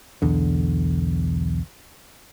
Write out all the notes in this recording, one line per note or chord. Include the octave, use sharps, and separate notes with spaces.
B1 E2 D3